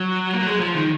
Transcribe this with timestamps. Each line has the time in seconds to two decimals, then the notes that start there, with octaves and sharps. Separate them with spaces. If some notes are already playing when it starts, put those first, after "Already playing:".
Already playing: F#3
0.33 A#3
0.42 F#3
0.47 G#3
0.60 F3
0.74 D#3